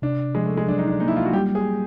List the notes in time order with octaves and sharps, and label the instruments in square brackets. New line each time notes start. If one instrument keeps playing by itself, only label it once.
[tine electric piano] C3 [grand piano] D4
[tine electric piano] F3 [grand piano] G#3
[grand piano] A3
G#3
[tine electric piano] F#3 [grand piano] D4
[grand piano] D#4
D4
[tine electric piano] A#3 [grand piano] D#4
[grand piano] E4
F4
F#4
[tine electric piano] G3 [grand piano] G4
[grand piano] G#4